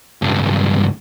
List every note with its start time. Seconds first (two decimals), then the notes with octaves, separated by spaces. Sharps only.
0.22 C#2 G2